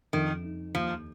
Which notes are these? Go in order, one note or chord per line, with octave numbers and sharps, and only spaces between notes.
F2 D#3
D#4
D#2 F3